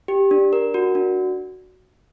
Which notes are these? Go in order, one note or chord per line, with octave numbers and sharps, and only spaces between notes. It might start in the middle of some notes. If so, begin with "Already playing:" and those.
G4
D4
A#4
F#4
D4